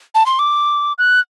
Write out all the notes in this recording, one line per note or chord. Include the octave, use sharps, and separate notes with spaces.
A5
C6
D6
F#6